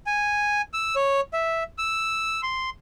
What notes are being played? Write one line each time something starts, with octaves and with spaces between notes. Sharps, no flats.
G#5
E6
C#5
E5
E6
C6